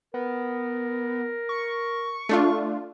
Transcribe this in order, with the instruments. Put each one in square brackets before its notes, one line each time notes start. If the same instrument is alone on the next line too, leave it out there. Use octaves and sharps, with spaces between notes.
[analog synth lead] B3 [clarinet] A#4
[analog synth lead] C#6
[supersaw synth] A3 D4 F4